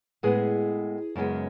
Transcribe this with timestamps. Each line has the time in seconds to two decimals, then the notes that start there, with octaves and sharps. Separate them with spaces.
0.23 A2 G#3 B3 G#4 B4
1.16 F#2 C#3 G#3 B3